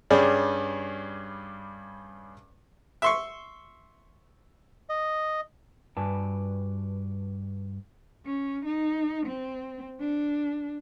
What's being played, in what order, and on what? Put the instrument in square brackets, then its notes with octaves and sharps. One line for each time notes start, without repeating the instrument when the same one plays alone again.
[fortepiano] G2 G3 C#4 G#4
E5 C6 C#6
[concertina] D#5
[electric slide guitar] G2 F#4 B4 D5 G#5 A5
[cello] C#4
D#4
C4
D4